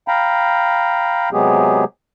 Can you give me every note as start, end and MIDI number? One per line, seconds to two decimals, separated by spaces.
0.08 1.29 77
0.08 1.29 79
0.08 1.29 82
0.08 1.29 83
1.33 1.84 48
1.33 1.84 54
1.33 1.84 56
1.33 1.84 59
1.33 1.84 67
1.33 1.84 68